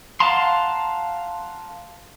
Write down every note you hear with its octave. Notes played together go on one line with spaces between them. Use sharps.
F5 F#5 A5 A#5 C6